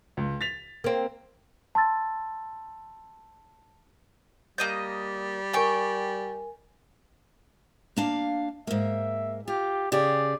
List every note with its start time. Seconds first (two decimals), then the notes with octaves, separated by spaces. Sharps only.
0.17 C#2
0.41 A6 B6 F7
0.84 A#3 C4
1.75 A5 C6 E6 A6
4.58 G3 A#3 D#5 G6
5.53 A#4 G5 G#5 C#6
7.97 A#3 D4 F5
8.67 G#2 A#3 E5
9.48 F4 G4
9.92 C#3 G4 G#4 D5